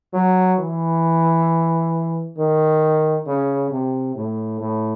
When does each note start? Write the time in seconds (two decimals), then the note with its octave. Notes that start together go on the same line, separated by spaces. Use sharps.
0.13 F#3
0.59 E3
2.38 D#3
3.27 C#3
3.71 C3
4.15 A2
4.61 A2